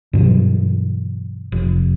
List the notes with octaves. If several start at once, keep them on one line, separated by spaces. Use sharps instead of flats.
G2 B2 E3 F#3
F1